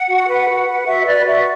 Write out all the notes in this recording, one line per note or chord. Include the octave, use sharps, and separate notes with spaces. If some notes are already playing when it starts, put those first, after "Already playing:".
Already playing: F#5
F#4
B4
F#4
B4
F#4 E5
B4 D5
F#4 E5